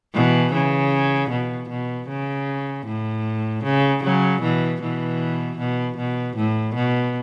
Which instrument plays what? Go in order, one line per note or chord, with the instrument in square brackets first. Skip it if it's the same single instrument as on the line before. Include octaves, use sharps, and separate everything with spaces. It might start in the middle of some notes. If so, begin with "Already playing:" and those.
[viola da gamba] B2 E3
C#3
B2
B2
C#3
A2
C#3
C#3 F#3
B2 E3
B2 E3
B2
B2
A2
B2